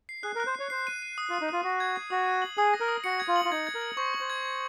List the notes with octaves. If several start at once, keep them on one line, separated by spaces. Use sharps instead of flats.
C7
G#4 F#6
A#4
F#6
C5
C#5 C7
C5 C7
D#7
D#7
D#6
F4
D#6
D#4
F4 D#6
F#4 D#6
G#6
C7
F#4 D#6
D#7
F#7
G#4 D#6
A#6
A#4
D#6
F#4 C#7
G#6
F4
F#7
F4
D#4 G#6
G#6
A#4
G#6
C5 C#6
F#7
C5
G#6
G#6